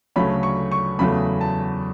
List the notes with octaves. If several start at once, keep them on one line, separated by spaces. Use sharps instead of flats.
D2 C#3 F#3 A3 C#4 B5
C#6
C#6
E2 C#3 F#3 A3 B5
A5